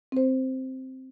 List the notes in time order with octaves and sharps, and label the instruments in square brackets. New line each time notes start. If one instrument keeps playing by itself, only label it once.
[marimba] C4 C5